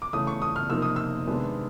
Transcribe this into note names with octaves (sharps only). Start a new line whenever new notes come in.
D6
C#3 E3 A3 D#6
C#6
D#6
F6
C3 F3 A#3 D#4 E6
D#6
E6
C3 D#3 G#3 B3 D4